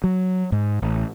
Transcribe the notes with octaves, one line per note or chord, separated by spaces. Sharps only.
F#3
G#2
A1